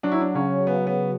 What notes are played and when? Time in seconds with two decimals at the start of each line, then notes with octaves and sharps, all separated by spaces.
0.03 F#3 D4
0.12 E4
0.21 D4
0.35 C#3 C#4
0.66 C#3 B3
0.87 B3